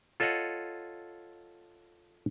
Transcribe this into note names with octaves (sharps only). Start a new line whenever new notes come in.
F4 A4 C#5 D#5 F#5